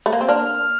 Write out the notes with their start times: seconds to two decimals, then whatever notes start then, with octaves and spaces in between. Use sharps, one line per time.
0.06 A3
0.13 A#3
0.21 C4
0.28 A#3 D4 F6